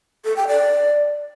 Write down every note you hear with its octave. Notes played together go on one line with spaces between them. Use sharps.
A4
G5
D5